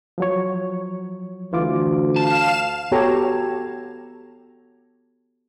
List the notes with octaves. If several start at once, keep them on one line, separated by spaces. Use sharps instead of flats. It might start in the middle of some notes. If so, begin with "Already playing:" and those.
F3 F#3 C#5
D2 E3 F4 D6
F5 A5 E7
B3 F#4 G4 A4 C#5 A#5